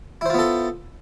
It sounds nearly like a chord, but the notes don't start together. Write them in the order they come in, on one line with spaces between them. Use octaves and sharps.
E4 C5 F4 B3 A4